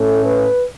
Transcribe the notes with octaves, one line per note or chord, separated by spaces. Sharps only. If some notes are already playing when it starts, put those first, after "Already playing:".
Already playing: A2 A3 C#4 A4
B4